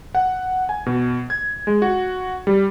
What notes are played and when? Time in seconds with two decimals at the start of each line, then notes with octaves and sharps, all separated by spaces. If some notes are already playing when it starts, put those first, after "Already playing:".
0.15 F#5
0.69 G#5
0.86 B2
1.30 G#6
1.67 G#3
1.82 F#4
2.47 G3